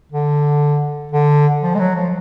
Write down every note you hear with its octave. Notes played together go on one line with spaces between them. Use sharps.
D3
D3
F3
G#3
F#3
F3